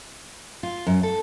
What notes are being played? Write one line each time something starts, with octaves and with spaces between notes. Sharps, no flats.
F4
F#2
A4